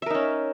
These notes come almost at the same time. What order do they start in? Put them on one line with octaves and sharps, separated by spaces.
E5 A#4 D#4 C#4